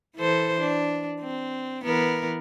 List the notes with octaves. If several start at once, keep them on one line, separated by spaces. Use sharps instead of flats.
E3 A4 C5
D4
C4
E3 B3 A#4